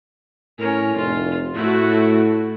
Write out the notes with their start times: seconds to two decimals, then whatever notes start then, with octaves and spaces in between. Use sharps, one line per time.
0.59 A2 C#4 A#4
0.96 F1 F4
1.55 A2 A3 E4 F#4